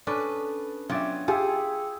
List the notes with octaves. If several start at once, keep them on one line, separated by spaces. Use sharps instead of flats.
C#4 D4 A4 B4 D5
F#3 B3 C#4 D4 F4 D5 E5
F4 G4 G#4 G5 G#5 D6 E6